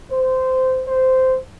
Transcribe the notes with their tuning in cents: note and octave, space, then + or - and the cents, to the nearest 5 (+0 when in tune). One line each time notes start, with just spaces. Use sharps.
C5 -15
C5 -10